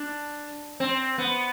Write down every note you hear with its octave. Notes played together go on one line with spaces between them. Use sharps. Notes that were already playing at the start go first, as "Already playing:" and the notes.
Already playing: D4
C4
B3